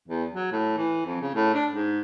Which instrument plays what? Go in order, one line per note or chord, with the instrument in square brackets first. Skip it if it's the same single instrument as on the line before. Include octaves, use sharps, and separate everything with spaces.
[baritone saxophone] E2
F#3
A2
E3
F2
C#3
A2
D4
G#2